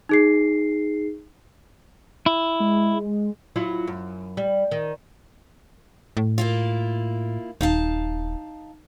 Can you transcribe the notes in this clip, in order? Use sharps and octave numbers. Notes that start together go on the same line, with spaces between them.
D#4 G#4 C7
E4
G#3
F#3 E4 F4
F#2
G3
D#3
A2
A#3 E4 F4
D#1 D#4 F5 A5